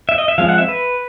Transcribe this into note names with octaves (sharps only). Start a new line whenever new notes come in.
E5
D#5
E5
F3 G#3 C4 F5
F#5
E5
B4